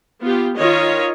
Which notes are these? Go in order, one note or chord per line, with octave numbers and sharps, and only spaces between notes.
B3 F4 G4
D#3 F4 C#5 D#5